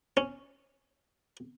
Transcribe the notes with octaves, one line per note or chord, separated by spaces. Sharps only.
C#4